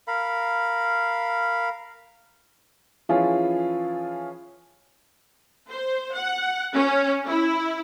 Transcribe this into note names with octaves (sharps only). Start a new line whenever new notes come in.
A#4 F5 B5
E3 F3 C#4 E4 F4 G#4
C5
F#5
C#4
E4